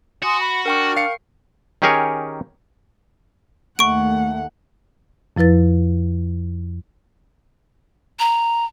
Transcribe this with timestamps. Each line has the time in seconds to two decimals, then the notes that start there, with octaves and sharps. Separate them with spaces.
0.23 F#4 G#5 C6 D#6
0.39 B5
0.66 D4 A#4 G5 C#6 F6
0.96 F5 C7 C#7
1.82 D#3 C#4 G4 G#4 A#4 C#5
3.79 D#2 A3 F#5 C#6 D7
5.37 F2 F3 E4 B4 A6
8.19 A#5